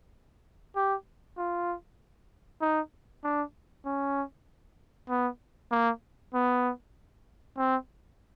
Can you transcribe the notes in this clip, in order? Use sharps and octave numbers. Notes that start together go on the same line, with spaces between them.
G4
F4
D#4
D4
C#4
B3
A#3
B3
C4